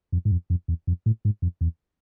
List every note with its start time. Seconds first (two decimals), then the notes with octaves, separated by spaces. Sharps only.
0.12 F2
0.25 G#2
0.31 F2
0.50 F2
0.68 E2
0.87 F2
1.06 A2
1.25 G#2
1.42 F2
1.61 E2